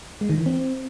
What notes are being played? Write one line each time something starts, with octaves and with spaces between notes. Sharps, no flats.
G#3
D#3
E3
C4